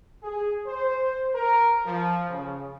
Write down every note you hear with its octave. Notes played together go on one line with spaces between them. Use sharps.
G#4
C5
A#4
F3
C#3